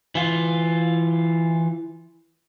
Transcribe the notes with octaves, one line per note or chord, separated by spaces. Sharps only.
E3 F4